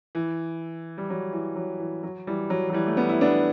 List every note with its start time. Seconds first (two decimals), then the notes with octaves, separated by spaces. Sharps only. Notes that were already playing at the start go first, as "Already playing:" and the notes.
0.15 E3
0.98 G3
1.10 F#3
1.33 E3
1.56 F#3
1.80 E3
2.03 F#3
2.27 E3 G3
2.50 F#3
2.69 F#3
2.73 E3 G3
2.87 A3
2.97 G3 B3
3.09 E4
3.21 B3 D4